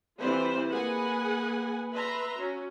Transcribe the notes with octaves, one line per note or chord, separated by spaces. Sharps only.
E3 G3 C4 F4 B4 C5
A#3 G#4 B4 F#5 G#5
B4 E5 A#5 C6
C#4 F#4